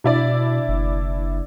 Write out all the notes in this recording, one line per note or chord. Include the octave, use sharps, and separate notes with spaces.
B2 D4 E4 D5
F#1